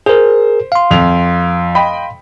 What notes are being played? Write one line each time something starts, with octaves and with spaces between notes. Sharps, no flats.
G#4 A#4 C5
F5 C6
F2 F7
D#5 G5 B5